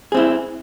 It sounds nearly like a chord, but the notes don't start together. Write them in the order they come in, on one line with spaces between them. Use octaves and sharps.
G#4 C4 E4